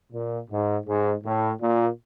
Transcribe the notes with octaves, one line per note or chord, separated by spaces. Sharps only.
A#2
G#2
G#2
A2
A#2